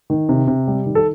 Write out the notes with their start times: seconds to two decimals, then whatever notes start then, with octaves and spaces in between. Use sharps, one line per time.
0.10 D#3
0.29 C3
0.48 C3
0.67 G3
0.86 D#3
0.95 A4